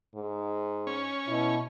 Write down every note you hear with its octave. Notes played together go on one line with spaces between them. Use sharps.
G#2
C#4
B2 E4